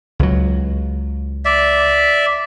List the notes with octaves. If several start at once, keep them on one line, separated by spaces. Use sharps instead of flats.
C#2 F#3
D5 E5